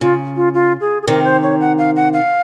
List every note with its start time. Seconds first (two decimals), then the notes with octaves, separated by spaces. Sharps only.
0.01 C#3 F4
0.36 F4
0.54 F4
0.81 G#4
1.03 G#4
1.07 C3 D#3 A#4
1.25 C5
1.43 C#5
1.60 F#5
1.78 F5
1.96 F#5
2.13 F5